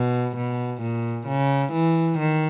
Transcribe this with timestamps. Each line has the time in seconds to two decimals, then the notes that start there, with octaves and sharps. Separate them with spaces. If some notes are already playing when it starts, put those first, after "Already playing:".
Already playing: B2
0.37 B2
0.82 A#2
1.28 C#3
1.73 E3
2.19 D#3